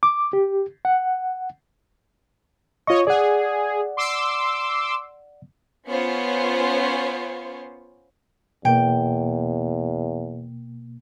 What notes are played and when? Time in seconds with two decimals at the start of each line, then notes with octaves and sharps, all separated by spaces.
0.03 D6
0.33 G4
0.85 F#5
2.87 F4 C#5 D#5 C#6
3.07 G#4 D5 F#5
3.97 C6 D6 E6
5.87 B3 C#4 F4 C5 C#5
8.65 E2 B2 A#3 G5